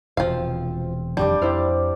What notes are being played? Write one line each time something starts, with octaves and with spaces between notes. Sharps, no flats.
E1 C3 F3 C4 F5
F1 F2 D#3 G3 D4 G4 D5
F2 E4 C5 F5